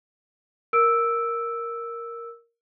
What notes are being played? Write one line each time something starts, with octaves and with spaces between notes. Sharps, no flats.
A#4 E6 D7